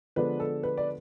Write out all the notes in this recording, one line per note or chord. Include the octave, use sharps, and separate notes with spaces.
D3 F3 G#3 B3 D4 B4
A4
B4
D5